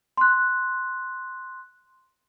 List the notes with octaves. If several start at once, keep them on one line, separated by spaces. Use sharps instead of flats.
C6 F#6